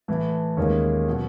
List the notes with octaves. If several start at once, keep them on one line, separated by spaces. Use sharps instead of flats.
A2 E3 A3
D#2 D#3 G#3 C#4
B2 F#3